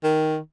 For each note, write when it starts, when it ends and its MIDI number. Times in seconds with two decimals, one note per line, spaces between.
0.04 0.37 51